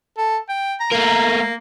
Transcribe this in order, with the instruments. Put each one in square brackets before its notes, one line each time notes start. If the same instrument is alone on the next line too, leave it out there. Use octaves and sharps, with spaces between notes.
[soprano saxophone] A4
G5
A#5
[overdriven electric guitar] A3 A#4 [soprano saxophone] A#3